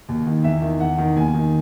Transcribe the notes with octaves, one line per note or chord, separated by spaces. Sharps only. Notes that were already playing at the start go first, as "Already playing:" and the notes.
D#2
D#3
E2 E5
D#3
E2 F#5
D#3
D#2 G#5
D#3